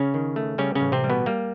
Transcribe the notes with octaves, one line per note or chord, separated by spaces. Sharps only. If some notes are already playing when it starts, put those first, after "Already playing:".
Already playing: C#3 C#4
D#3
A3
C#3 G3 C#4
C#3 C#4
A1
C3 C4
G3
B2 B3
G3 A#3